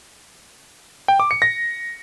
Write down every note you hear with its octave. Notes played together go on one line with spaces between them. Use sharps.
G5
D6
C#7
A#6